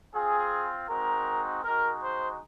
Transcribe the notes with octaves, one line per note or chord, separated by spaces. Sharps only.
C4 F4 G#4
G#3 C4 D#4 F#4 A#4
G#3 D#4 F#4 A#4
C5